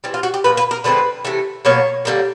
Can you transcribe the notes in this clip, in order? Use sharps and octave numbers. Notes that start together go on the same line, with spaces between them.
E3 G3 C4
F4
F#4
G4
A#2 F3 A#3 B4
B4
A#4
D3 F3 G#3 C4 B4
C3 E3 A3
B2 F#3 A#3 C#5
D3 G3 A#3